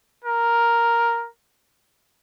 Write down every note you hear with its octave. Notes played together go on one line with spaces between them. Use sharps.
A#4